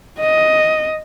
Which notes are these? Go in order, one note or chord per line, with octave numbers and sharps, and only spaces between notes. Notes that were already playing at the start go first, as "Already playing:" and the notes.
D#5